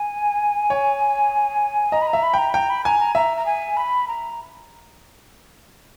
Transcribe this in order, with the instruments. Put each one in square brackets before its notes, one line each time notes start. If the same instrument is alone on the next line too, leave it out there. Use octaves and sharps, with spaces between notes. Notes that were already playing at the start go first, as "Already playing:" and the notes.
Already playing: [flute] G#5
[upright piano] C#5
[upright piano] D#5 [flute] A#5
[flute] B5
A#5
[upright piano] E5
[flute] B5
[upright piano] G5 [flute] A#5
[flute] B5
[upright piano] G5 [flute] A#5
[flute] B5
[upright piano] G#5 [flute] A#5
[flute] A#5
[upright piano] E5 [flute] A#5
[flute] A#5
G#5
B5
A#5